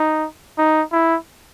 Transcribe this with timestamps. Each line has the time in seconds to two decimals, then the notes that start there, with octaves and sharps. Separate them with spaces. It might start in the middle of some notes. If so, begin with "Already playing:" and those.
Already playing: D#4
0.58 D#4
0.92 E4